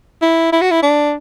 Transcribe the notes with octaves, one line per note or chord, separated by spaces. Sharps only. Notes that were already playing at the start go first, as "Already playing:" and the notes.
E4
E4
F#4
E4
D4